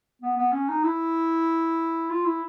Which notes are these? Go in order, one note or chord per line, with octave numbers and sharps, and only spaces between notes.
B3
B3
C#4
D#4
E4
F4
E4